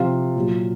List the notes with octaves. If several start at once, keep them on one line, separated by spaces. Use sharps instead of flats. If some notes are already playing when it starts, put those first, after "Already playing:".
Already playing: C3 F3 F4 F5
A#2 F#3